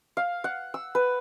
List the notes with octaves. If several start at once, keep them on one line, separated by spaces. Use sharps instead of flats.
F5
F#5
E6
B4